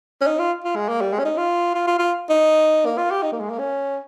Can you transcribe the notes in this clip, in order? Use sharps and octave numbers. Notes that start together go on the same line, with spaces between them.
C#4
D#4
F4
F4
G#3
A#3
G3
G#3
C#4
D#4
F4
F4
F4
F4
D#4
A#3
F4
G4
D#4
A#3
G#3
A#3
C#4